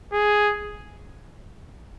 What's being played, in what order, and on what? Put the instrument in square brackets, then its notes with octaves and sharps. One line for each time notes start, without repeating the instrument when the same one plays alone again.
[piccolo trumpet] G#4